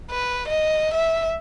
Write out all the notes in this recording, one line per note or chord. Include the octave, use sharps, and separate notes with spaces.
B4
D#5
E5